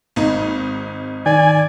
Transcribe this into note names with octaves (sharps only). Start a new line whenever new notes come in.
G#1 D#4
D#3 D5 G#5